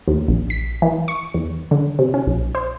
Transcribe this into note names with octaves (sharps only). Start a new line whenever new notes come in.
D#2
A#1
B6
E3
C#6
E2
D3
C3
C#4
B1
C5